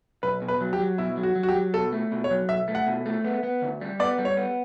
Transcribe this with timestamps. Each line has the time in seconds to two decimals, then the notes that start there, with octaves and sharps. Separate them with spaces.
0.23 B1 B4
0.42 B2
0.48 B4
0.61 F#3
0.73 G4
0.79 F#3
0.98 B2 E4
1.17 F#3
1.23 F#4
1.35 F#3
1.43 F#4
1.49 G4
1.55 F#3
1.74 B2 A4
1.92 A3
2.12 B2
2.24 C#5
2.30 F#3
2.49 B1 E5
2.68 A3
2.75 F#5
2.87 B2
3.06 A3
3.24 B3
3.43 B3
3.62 D2
3.81 G3
4.00 B3 D5
4.18 G3
4.25 C#5
4.37 B3